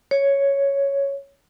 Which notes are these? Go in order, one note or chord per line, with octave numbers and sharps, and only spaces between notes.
C#5